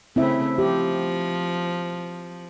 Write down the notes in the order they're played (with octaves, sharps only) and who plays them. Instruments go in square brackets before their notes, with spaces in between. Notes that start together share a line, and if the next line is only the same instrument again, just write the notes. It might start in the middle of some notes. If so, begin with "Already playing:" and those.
[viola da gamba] C#3 A3 [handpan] C4 E4 E5
[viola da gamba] F3 [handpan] G4